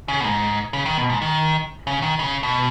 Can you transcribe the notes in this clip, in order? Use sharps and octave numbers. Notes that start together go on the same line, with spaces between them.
C#3
B2
G#2
C#3
D#3
B2
G#2
D#3
C#3
D#3
C#3
B2